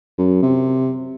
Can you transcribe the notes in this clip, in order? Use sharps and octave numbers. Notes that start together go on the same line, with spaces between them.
F#2
C3